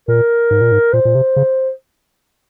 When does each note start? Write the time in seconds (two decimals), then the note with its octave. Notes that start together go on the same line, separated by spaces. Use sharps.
0.08 A#2 A#4
0.51 G#2
0.61 A#2
0.72 G#2
0.93 A#2 C5
1.05 A#2
1.15 C3
1.36 C#3